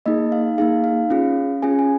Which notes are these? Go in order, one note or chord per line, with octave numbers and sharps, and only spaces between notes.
A#3 D#4 G#4 D#5
F5
A#3 D#4 G#4 F5
F5
C#4 F4 G#4
C#4 F4 G#4 G#5
G#5